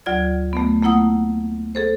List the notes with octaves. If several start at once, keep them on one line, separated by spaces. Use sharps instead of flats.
D2 F#3 F4 D5 G#6
A3 B3
A3 A#3 E4 F#5 D#6
G#4 A4 C5